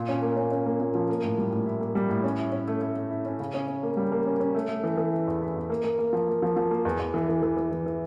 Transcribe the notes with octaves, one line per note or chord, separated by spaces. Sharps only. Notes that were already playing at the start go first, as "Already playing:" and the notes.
Already playing: A#2
C#4
A#3
C#4
C#4
A#3
A#2
F3
A#3
A2
G3
A2
E4
A#3
G3
A2
C#4
E4
C#4
A3
A3
A3
E4
C#4
C#3
C#4
C#4
A#3
G3
A#3
C#4
C#4
A3
A3
E3
E3
E4
E2
E4
E2
A#3
A#3
A#3
F3
A#3
F3
F3
A#3
E2
E2
E3
E3
E3
E3
E3
E3